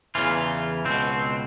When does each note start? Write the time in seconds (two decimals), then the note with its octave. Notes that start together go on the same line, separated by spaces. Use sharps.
0.15 E2 C#3 E3 F4
0.85 C#2 B2 C4